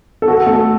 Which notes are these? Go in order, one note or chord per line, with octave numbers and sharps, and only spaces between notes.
A4
F#4
A3 A4